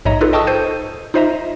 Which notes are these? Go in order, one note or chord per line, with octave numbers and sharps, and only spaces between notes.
A#1 G#2 C#5 D#5 E5 A#5
D#4 F4 G#4 A4 B4
D#5 G5 A5 C#6 D#6 E6
A4 C5 G6 D#7
D#4 F4 C5 D#5 E5 A#5